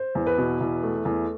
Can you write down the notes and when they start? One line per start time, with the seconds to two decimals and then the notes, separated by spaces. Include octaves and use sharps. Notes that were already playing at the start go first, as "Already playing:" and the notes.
Already playing: C5
0.15 E2
0.27 B4
0.38 B2
0.61 E2
0.83 A3
1.05 E2